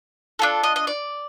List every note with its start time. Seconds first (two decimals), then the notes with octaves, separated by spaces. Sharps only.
0.39 D4 F4 A4
0.63 D#5
0.76 D#5
0.87 D5